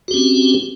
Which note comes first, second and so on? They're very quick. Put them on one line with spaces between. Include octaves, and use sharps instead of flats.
F#4 G4 C#4 C4